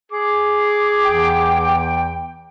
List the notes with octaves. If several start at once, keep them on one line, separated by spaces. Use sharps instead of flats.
G#4 D6
E2 E3 G5